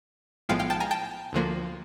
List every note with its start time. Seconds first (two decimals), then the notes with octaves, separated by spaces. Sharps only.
0.49 B1 A2 F3 G#3 B3 F5 G5
0.59 F5 G5
0.70 G5 A5
0.80 G#5 A#5
0.91 G5 A5
1.33 D2 D3 F3 A#3